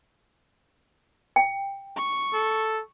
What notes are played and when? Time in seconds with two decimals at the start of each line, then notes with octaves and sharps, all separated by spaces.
1.36 G5
1.96 C#6
2.34 A4